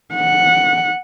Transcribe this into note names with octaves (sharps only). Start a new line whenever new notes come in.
F#5